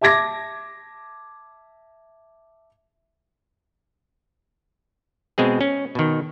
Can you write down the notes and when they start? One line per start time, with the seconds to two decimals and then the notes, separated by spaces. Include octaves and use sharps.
0.01 E5 A5 D6 G#6 A#6
5.38 B2 G#3 C4 G#4
5.61 C#4
5.95 B2 D#3